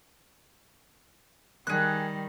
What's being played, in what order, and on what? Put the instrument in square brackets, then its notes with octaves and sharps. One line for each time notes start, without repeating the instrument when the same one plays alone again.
[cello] D#3 G3 [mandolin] G#4 F#6